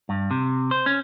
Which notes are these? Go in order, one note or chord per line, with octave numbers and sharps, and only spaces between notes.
G2
C3
C5
C#4